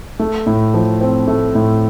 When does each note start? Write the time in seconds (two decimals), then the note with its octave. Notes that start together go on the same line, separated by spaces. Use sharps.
0.20 A3
0.46 A2
0.74 F3
1.01 C4
1.28 A3
1.55 A2